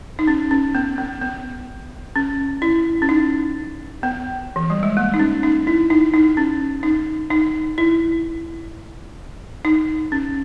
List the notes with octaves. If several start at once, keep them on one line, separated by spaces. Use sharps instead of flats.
D#4
C#4
C#4
B3
B3
B3
C#4
E4
C#4
D#4
B3
E3
G3
G#3
A#3
D#4
C#4
D#4
E4
D#4
D#4
C#4
D#4
D#4
E4
D#4
C#4